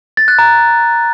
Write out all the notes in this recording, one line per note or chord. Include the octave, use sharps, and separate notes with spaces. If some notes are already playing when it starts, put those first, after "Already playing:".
A6
F#6
A#5